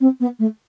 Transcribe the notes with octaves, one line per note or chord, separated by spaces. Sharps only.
C4
B3
A3